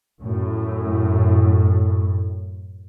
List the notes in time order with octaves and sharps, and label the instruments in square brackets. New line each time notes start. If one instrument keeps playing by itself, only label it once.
[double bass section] F#2 A2